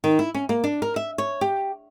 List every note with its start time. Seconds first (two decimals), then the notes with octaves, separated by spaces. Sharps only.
0.04 D#3
0.19 E4
0.34 C#4
0.49 A#3
0.64 D4
0.82 A#4
0.96 E5
1.18 C#5
1.41 G4